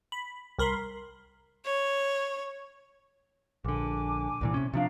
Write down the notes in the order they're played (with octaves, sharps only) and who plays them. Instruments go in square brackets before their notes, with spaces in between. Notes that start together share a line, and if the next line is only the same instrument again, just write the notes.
[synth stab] B5
C2 A#4 B5 C6
[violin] C#5
[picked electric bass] A#1 D3 [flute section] D4 G#5 D6
[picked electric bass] C2 A#2 E3
C3 C#4
[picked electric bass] C3 F3 D4 [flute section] F5 A#5